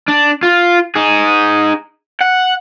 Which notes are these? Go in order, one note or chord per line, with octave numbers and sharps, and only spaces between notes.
D4
F4
D#4 G#4
F#5